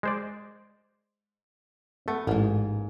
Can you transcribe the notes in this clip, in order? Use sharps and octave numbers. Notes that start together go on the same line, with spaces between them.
G#3 C5 D5
A3 B3
A1 G#2 A#3